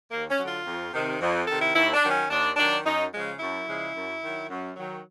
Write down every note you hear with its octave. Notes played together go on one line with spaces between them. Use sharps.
D#2 A#3
C#4
D3 F#3
F4
F2
C3 D#3
F2
C3 D#3 A4
E4
D#2 E4
D4
D#3 F#3
C#4
D#2 D4
D#3 F#3 D4
F#2 D#4
C#3 F3 G#3
F#2 E4
C#3 F3 G#3
F#2
D#3 F#3
F#2
D#3 F#3